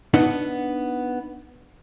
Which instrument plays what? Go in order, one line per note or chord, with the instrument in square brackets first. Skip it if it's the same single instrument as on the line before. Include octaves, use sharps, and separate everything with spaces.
[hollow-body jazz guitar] B3 D4 D#4 B4 F#5